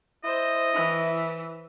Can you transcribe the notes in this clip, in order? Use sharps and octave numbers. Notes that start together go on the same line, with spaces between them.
E4 C5 D#5
E3